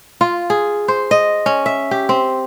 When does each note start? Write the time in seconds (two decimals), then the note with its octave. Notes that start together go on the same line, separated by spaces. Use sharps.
0.21 F4
0.50 G#4
0.88 C5
1.11 D#5
1.46 C#4
1.66 E5
1.91 G4
2.09 C4